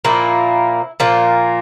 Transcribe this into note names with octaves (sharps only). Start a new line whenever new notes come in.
A#2 F3 A#3 E4
A#2 F3 A#3